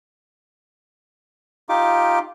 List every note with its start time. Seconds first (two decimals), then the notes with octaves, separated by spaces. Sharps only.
1.69 D#4 F4 G4 D6